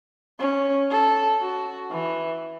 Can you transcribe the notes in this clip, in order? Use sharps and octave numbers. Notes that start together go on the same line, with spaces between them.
C#4
A4
F#4
E3